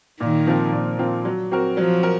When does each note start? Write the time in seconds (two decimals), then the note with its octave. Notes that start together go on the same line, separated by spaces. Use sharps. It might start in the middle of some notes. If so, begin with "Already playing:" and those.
0.20 A#2 D#3
0.47 F3 C4 F4 A#4
0.73 A#2
0.98 F3 C4 F4 A#4
1.25 F#3
1.51 C4 F#4 A#4
1.77 F3 F#3
2.03 A#4